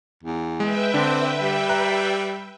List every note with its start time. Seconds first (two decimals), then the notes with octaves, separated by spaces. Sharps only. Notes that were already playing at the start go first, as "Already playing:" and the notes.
0.23 E2
0.60 G#3 B4 E5 G5
0.94 D3 C4 D4
1.40 G3
1.69 A#5 F#6